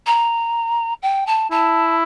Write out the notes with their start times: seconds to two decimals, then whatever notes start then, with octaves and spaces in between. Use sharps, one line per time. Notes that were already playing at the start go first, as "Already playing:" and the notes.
0.06 A#5
1.02 G5
1.27 A5
1.51 E4 A5